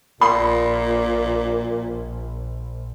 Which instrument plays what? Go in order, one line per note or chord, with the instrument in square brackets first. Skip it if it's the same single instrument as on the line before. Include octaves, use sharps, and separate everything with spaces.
[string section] A#1 [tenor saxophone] A#2 [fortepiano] C6